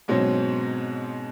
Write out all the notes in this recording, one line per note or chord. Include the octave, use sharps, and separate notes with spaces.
G#2 B2 F#3 C4 C#4